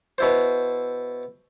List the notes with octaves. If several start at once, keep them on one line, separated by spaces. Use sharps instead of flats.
B2 E4 C5